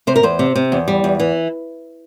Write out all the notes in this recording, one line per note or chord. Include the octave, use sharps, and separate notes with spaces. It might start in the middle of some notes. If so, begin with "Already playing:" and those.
C3 C5
A#4
E2 C5
C3
C3
E2
G3
E2
E3